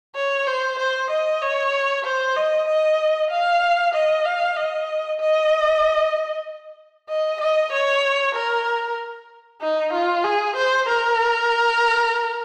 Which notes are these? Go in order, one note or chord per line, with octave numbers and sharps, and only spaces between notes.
C#5
C5
C5
D#5
C#5
C5
D#5
D#5
F5
D#5
F5
D#5
D#5
D#5
D#5
C#5
A#4
D#4
F4
G#4
C5
A#4